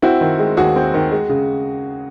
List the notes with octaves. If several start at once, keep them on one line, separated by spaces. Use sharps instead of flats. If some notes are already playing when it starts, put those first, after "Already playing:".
C4 E4 F#4
D#3
G#3
D#2 F#4 G#4
C4
D#3
G#3
C#3